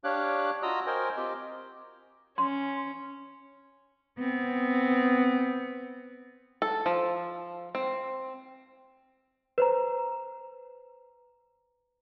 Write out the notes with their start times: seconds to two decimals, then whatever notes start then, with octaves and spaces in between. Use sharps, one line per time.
0.04 D4 G4 C#5 F5 D6 F#6
0.63 F4 F#4 D#5 A#5 D#6 E6
0.87 A#4 C5 D#5 G5 G#5
1.17 C4 F4 G4 D#5 G5
2.38 C#4 C6
4.19 B3 C4
6.62 A4
6.86 F3
7.75 C4
9.58 B4 C5 A#5